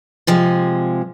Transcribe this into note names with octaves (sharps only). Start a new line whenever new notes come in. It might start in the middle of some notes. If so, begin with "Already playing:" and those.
C3 F3 G#3